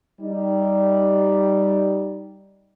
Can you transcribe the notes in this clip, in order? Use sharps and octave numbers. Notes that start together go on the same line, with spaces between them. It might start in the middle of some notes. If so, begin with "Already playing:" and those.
G3 D#4